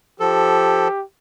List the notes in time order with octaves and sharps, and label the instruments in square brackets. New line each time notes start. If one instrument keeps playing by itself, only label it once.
[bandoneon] F3 A4 [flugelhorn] G4